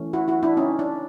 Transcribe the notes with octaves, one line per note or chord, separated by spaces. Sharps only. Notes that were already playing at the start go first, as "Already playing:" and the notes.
Already playing: E3 A3 C#4
E4 F#4
E4 F#4
D4 E4
C#4 D#4
D4